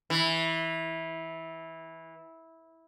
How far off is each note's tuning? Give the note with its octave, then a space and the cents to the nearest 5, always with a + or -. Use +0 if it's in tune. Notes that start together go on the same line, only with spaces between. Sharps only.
E3 -15